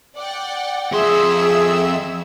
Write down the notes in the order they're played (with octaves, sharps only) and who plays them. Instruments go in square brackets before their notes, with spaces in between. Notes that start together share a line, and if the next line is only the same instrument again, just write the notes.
[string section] D5 F#5 G5
[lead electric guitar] F2 C6 [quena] G#4 [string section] E5 E6